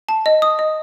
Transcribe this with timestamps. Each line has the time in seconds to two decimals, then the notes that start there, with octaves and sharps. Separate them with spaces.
0.09 A5
0.26 D#5
0.42 D#6
0.59 D#5